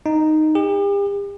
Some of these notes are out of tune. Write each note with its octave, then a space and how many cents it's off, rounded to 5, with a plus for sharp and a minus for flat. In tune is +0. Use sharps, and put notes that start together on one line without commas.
D#4 -5
G4 +40